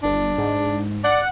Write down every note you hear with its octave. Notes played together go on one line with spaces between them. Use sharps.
G1 D4
G#2
D5 F#5